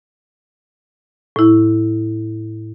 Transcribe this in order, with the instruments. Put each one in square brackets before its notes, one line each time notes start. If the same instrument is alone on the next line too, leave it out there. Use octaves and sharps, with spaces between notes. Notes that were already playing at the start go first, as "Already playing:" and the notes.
[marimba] A2 E4